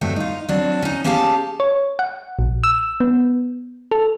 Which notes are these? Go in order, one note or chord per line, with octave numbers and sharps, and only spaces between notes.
G2 F#3 A3 C4
D#4 F4
F#3 C4 D4
C#4 D#4
A#3 C#4 G4 G#4 F5 A5
C#5
F#5
A#1
E6
B3
A4